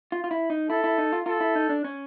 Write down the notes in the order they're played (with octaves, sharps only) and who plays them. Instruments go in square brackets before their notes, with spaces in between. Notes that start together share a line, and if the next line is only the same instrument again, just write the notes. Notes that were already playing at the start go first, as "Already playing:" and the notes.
[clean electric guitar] F4
F4
E4
D#4
[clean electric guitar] E4 [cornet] A4
[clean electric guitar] E4
D#4
F4
[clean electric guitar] F4 [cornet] A4
[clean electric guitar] E4
D#4
D4
C#4